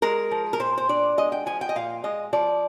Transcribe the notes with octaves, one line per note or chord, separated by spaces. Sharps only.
G#3 A#4
F3
A#4
A#2 C5
C5
D4 D5
G#3 D#5
G5
F3 G#5
G5
D#5
A#2 F5
G#3 D#5
F3 D5